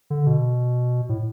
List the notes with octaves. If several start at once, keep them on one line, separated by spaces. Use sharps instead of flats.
D3
B2
A2